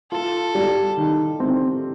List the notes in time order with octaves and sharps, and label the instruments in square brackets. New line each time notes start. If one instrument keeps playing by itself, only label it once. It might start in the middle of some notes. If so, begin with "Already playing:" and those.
[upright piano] F4 [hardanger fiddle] A4
[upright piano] G3
D#3
C4